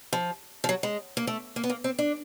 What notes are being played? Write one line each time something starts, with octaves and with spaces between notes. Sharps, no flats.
F3
F3
F#3
G#3
A#3
A3
A#3
B3
A#3
C4
D4